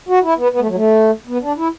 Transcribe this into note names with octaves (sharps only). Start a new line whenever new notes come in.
F#4
E4
B3
B3
A3
F#3
A3
B3
D4
E4